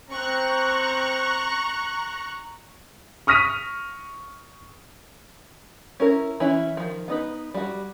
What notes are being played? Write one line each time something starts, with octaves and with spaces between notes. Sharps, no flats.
C4 A#5 C#6 F#6
C#6 D#6 F6 A#6 B6 D#7
C#4 E4 A#4
E3 C#4 E4
D#3 F3
B3 D#4 B4
G3 F#4